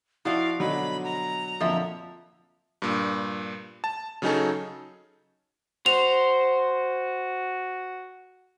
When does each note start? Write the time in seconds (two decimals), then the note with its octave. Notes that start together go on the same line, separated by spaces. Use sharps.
0.25 F3 E4 F#4 D5 F5
0.60 B2 D3 F#3 D#5 B5
1.04 A#5
1.60 F2 A#2 D3 F3 E5
2.82 G2 A#2
3.84 A5
4.22 C#3 F#3 C#4 D#4 G#4 A4
5.86 F#4 C5 F7